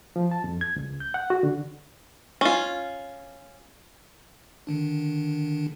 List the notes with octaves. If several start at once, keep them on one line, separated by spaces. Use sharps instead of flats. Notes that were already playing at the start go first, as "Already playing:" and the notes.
F3
A5
F2
G#6
C#2
G6
F#5
F#4
D3
C#4 F4
D3 D#3 D4